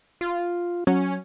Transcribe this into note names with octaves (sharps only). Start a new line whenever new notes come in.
F4
F#3 C#4